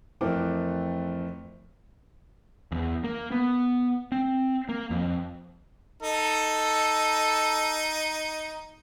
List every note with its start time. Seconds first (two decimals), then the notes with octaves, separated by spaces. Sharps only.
0.21 F2 E3 A3 C4 A#4 D6
2.72 E2
3.04 A#3
3.31 B3
4.12 C4
4.69 A#3
4.90 F2
6.02 D#4 A4